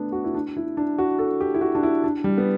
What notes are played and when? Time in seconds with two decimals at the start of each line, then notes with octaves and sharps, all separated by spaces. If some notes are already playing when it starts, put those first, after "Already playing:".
Already playing: A3 B3 D4
0.12 F#4
0.24 E4
0.34 D4
0.57 E4
0.77 D4
0.98 F#4
1.19 A4
1.41 G4
1.54 E4
1.61 F#4
1.75 D4
1.83 E4
2.04 D4
2.24 G3
2.38 B3